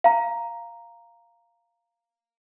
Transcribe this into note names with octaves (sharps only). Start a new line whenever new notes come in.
F5 A#5